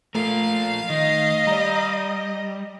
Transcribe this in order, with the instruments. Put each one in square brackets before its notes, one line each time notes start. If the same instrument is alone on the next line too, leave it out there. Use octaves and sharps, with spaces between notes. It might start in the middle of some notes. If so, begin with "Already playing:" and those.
[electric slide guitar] F3 F4 A#4 [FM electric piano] A3 [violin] F5
[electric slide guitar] D#3 [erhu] D#5
[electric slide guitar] G3 [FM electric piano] D5 A#5